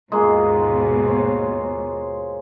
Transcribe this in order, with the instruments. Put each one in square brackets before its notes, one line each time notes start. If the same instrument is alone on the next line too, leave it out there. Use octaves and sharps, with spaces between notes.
[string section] D#2 G#2 B2 [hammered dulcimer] G#3 A#3 F4
[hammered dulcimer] C5 C#5